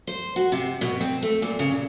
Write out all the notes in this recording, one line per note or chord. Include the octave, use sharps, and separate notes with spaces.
C5
F#4
C3
B2
C4
A3
A#2
C#3
A#2